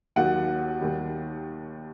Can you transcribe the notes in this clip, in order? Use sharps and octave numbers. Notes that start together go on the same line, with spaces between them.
D#2 D#3 F#3 F#5
D#2 D#3 G3